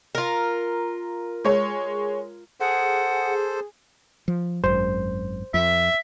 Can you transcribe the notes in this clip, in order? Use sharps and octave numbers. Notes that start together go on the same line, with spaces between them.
F4 A#4
G#3 C#5
G#4 A4 C5 F#5
F3
G#1 F#2 C5
F2 E5